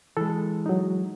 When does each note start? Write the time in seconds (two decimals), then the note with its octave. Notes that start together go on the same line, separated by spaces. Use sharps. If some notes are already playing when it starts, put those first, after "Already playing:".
0.17 E3 G#3 A4
0.66 F#3 D#4